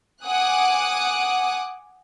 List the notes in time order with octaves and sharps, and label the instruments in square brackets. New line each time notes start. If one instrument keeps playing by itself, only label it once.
[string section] F#5 G#5 D6 D#6 F#6